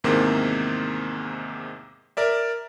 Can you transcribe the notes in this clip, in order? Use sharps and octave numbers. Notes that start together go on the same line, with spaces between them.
E2 G#2 C3 D#3 A#3
A#4 D5 E5